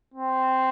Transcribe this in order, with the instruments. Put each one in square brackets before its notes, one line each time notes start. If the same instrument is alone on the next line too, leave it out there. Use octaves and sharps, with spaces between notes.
[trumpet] C4